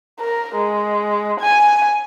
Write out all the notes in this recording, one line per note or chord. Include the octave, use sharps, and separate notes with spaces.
A#4
G#3
G#5